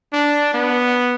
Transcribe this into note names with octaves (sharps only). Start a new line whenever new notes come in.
D4
B3